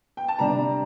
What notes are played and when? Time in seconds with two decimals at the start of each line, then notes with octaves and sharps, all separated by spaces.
0.17 G5
0.28 A5
0.39 C3 G3 D4 A#5